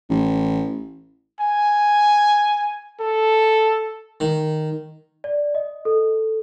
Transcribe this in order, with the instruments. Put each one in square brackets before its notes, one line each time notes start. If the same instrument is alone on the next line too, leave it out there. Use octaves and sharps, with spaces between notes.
[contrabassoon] A1
[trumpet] G#5
A4
[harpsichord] D#3
[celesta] D5
D#5
A4